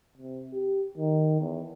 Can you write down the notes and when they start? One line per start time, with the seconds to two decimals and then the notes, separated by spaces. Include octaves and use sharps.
0.17 C3
0.53 G4
0.97 D#3
1.40 E2